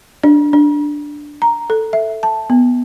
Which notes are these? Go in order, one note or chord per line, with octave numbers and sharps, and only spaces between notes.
D4
D4
A#5
A4
E5
A5
B3